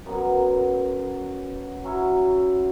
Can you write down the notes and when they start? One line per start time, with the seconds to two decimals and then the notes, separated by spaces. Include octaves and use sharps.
0.06 F#2 F#3 B3
1.84 F#3 C#4 E4 C#5